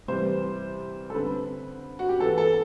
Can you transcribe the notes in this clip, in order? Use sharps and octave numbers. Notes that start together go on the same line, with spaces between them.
C3 E3 G3 C5
A4
D3 G3 C4 B4
F#4
G4
E3 B3 A4
A4